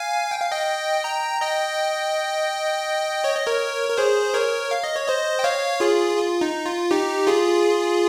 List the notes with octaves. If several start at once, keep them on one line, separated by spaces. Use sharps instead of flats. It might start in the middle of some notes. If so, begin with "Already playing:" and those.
Already playing: F5 G#5
G5
F5
D#5 G5
G5 A#5
D#5 G5
C#5
D#5
A#4 C#5
A#4
G#4 C5
A#4 C#5
F5
D#5
C#5
C5 D#5
G5
C#5 F5
F4 G#4
F4
D#4
F4
D#4 G4
F4 G#4